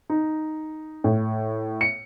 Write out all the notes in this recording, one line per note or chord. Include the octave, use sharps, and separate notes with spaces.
D#4
A2
C#7